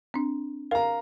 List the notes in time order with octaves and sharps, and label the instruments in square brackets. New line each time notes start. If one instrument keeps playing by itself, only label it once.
[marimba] C4 D4
[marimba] A#4 [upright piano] F5 A#5